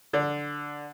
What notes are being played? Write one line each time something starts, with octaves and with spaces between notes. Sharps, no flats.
D3